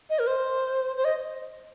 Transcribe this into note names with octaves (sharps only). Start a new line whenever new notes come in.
D#5
A#4
C5
C5
D#5